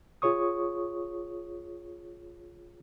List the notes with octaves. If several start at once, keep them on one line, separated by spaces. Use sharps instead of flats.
F4 G#4 C#5 C#6 D#6